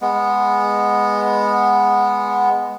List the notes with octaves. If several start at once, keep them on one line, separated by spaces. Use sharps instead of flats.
G#3 B3